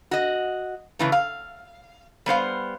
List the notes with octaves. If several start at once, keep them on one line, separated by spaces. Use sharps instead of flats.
F#4 D#5
C#3 E3 A3
F5
G3 B3 C5 F5